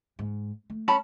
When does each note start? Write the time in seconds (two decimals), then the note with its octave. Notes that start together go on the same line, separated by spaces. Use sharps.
0.19 G#2
0.70 A3
0.88 C#4 A5 B5